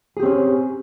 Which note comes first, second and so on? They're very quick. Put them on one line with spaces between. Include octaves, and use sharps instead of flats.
G#4 G4 C4 C#4